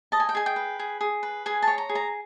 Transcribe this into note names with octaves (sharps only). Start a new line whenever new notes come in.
D#5 A5
G#5
G5
G#4 G#5
G5
B4
G#4
G#4
B4
G#4 G#5
A5
C#5
A#5
G#4
A#5